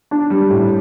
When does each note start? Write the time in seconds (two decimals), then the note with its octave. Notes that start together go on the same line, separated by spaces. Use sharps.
0.11 D4
0.30 G3
0.50 A2